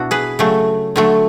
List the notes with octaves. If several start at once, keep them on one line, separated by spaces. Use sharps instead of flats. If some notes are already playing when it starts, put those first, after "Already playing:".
Already playing: B2 D4 E4 F#4
G#4 B4
C#3 F#3 A3
D3 F#3 A3